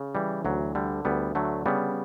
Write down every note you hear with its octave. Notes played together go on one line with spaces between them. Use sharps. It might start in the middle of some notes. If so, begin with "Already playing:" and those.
Already playing: C#3
E3 G3
D2 F#3
D3 G3
D2 G3 B3
D3 F#3 A3
C#3 G3 B3